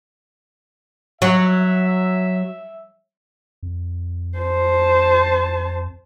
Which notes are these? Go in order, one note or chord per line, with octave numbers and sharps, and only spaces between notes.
F#3 E5
F2
C5 A5